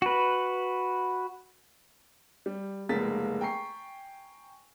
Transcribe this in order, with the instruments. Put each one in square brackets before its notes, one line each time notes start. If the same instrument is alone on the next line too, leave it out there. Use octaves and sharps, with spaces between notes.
[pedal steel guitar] F#4 B4
[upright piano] G3
F1 C#2 G#3 A#3 A6 B6
G5 G#5 A#5 C#6 C7